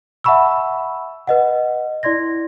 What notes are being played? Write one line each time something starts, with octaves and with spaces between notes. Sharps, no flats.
E5 F#5 A5 B5 C#6 E6
B4 D#5 F#5
E4 D5 C6 G#6 A#6